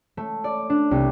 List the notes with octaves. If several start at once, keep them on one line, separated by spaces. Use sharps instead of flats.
A3
D5
D4
C2